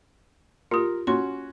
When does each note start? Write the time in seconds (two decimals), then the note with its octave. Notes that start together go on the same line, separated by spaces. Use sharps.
0.71 F4 G4 A#4
1.07 C#4 F#4 C6